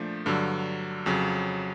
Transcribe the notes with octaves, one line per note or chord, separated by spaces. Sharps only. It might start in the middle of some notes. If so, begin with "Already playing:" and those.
Already playing: A#2 F3 A3 D4
G2 D3 F#3
F2 C#3 F#3